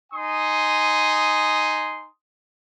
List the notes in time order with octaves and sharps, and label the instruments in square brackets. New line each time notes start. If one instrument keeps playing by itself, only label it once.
[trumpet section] D#4 G#5 C6 D#6